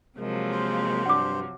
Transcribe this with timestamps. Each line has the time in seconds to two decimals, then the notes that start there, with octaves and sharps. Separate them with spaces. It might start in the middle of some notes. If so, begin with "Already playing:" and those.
0.18 C3 F3 F#3 G#3 A#3
0.51 C5
1.06 G2 D4 F#5 D6